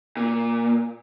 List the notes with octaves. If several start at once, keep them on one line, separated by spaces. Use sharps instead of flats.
A#2